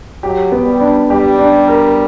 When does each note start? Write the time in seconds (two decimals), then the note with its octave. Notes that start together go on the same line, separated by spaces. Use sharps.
0.23 F#3 G4
0.52 B3
0.66 G3
0.81 D4
1.10 G3 G4
1.39 D4
1.68 A#4